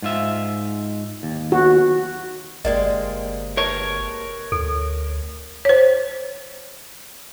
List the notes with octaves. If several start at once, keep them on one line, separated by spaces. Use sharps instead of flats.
G#2 F4 E5
D#2
F#4
G1 C3 G#3 A#3 D5 D#5
A#4 B4 C#5 A5
D2 A4
C5 C#5